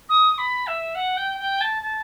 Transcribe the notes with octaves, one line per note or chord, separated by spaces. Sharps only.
D#6
B5
E5
F#5
G5
G5
A5
A5